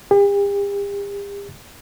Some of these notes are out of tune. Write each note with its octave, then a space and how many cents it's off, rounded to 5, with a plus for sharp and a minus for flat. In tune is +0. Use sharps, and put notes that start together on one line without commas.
G4 +45